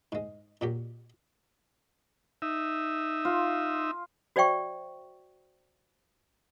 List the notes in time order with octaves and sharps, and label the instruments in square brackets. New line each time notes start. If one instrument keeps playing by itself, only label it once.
[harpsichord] G#2 G#3
A#2 F#3 G4
[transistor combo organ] D#4 E5
[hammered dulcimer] F4
[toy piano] F#4 C5 D5 E5 G5 C#6